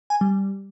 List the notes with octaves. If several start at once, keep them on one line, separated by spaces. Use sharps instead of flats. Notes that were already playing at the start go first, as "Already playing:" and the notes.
G#5
G3